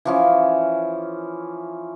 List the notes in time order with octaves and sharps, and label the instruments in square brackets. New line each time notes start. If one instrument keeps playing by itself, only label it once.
[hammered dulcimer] E3 F3 C#4